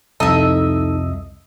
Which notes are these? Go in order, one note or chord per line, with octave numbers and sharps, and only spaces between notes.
C2 F2 D#4 A4 D#5 E5 E6